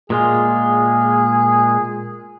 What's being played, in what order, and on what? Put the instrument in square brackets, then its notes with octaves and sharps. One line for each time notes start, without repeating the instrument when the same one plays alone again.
[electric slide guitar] A#2 G#3 F4 [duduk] G#4